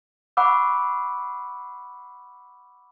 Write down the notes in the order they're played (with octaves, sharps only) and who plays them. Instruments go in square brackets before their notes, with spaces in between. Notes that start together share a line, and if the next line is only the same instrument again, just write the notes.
[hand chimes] F#5 B5 C#6 D6 E6